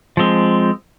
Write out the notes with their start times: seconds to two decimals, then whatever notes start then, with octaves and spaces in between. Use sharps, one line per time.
0.17 F3 G#3 C4